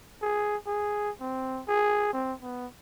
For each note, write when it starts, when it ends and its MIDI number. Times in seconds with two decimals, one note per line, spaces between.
0.22 0.57 68
0.67 1.10 68
1.20 1.62 60
1.68 2.10 68
2.13 2.33 60
2.42 2.66 59